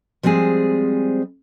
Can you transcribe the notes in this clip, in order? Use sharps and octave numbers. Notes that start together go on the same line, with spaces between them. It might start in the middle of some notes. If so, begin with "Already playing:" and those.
F3 G3 G#3 C4 G#4